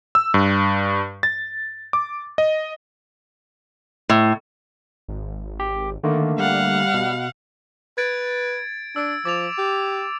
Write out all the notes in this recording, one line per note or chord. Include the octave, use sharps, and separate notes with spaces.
E6
G2
A6
D6
D#5
A2
G#1
G4
D3 D#3 A3 A#3
G3 F5 F#5
B2
B4 G#6 A6 D7
D4 E6 D7
F3 D6 A6 F7
G4